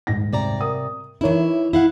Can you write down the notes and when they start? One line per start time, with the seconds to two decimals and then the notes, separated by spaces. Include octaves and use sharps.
0.07 D#1 G#2 A#6
0.33 C3 D5 A#5
0.60 A#4 D#6
1.21 E3 D#4 E4 A#4 C#5
1.73 E4 F5 F#5